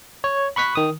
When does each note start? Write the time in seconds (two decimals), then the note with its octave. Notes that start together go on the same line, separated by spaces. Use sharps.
0.24 C#5
0.56 B5 C#6 F#6 B6
0.75 D#3 D#6